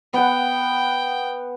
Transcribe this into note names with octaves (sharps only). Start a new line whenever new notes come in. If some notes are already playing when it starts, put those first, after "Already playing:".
B3 F#5 G5